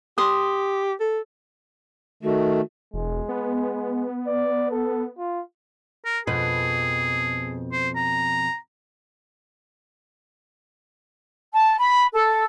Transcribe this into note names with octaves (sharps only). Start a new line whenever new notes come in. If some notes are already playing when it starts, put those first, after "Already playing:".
G4 C6 D#6
A4
D#3 A3 F#4
E1 G#3
B3
D5
A4
F4
A#4
F2 B2 G#4 B4
C5
A#5
A5
B5
A4